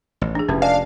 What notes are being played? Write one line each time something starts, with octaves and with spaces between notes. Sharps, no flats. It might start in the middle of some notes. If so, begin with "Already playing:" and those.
A1
D4 G#4
F1 E3 C#4 G4 B4
D4 D#5 F5 G#5